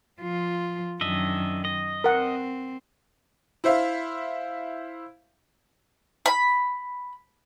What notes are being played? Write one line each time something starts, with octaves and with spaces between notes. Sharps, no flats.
F3 F4
F#2 D#3 D4 D#5 E5
D#5
C4 A#4 F#5
E4 C5 E5 F5
B5